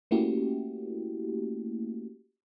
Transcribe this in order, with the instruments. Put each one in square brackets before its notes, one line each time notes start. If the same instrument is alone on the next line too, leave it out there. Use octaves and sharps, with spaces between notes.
[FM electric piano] A3 A#3 C#4 E4 F#4 G4